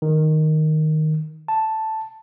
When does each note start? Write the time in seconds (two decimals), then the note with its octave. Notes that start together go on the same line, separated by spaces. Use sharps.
0.02 D#3
1.48 A5